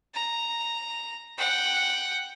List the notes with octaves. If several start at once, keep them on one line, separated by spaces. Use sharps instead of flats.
A#5
F#5 G5